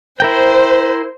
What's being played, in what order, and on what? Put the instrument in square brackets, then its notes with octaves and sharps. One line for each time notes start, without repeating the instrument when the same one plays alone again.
[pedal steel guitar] E4 A#4 G5 [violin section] C5